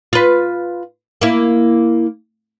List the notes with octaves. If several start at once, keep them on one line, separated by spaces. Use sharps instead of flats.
F4 B4
A#3 E4